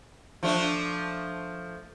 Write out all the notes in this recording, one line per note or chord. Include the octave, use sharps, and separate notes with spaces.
F3 A3 D4